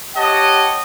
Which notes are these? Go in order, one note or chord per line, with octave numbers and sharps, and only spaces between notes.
G4 C#5 D#5 F#5 A5